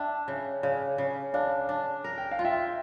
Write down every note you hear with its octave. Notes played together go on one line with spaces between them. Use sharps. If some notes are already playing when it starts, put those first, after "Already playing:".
Already playing: D4 E5 G5
C#3
C#3 D5 F5
C#3
D4 D5 F5
D4
A#4
G5
F5
F4
E5 G5